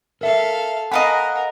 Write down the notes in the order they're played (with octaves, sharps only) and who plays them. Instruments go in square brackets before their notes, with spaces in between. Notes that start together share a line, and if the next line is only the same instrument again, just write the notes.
[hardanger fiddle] A4 F5 [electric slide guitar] A#4 E5
[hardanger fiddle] A#4 [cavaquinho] D#5 F5 B5 [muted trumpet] F#5 [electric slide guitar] G#5